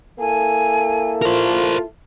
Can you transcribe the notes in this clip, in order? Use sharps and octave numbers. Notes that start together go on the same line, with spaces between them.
A#3 E4 A4 G#5
F4 A#4 C5